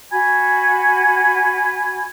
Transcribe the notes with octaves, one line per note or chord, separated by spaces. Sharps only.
F#4 G#5 B5 G#6